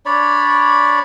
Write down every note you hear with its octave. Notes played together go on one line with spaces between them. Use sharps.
D4 C#5 D5 B5